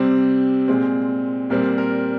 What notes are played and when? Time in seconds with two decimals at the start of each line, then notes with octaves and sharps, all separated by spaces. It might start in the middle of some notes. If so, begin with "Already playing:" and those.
Already playing: C3 G3 C4
0.68 A#2 G#3 C4
1.50 A#2 G3 C4 A#4
1.78 A#4